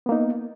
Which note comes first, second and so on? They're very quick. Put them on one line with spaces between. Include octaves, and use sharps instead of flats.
B3 A#3 D#4